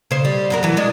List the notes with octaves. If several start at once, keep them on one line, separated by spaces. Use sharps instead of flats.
C#3 C5
G3
F#2 F#4 A#4
E3 F#3
G#3 D4